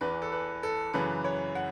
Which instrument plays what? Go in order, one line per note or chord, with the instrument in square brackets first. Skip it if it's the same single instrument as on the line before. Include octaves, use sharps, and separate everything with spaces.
[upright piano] E2 E3 B4
A4
B4
A4
F#2 C#3 E3 B4
C#5
F#5